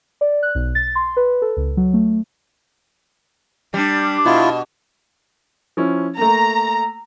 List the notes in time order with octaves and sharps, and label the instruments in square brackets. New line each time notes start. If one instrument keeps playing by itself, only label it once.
[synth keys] D5
F#6
B1
A6
C6
B4
A4
C#2
F#3
A3
[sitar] G3 [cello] D4
[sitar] B2 [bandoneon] E4 F4
[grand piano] F3 C#4 E4
[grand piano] A3 A#3 [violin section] A#5